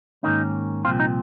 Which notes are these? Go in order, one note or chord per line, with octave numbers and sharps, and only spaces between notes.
G#2 D#3 A#3 C#4 D#4
C2 A#2 F3 C4 F4
D#4